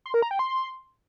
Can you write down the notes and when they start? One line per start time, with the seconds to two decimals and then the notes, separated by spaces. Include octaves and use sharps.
0.06 C6
0.14 A#4
0.22 A#5
0.31 G5
0.39 C6